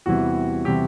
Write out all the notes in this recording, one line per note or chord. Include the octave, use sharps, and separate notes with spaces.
E2 C3 E3 G3 F#4
C3 E3 G3 G4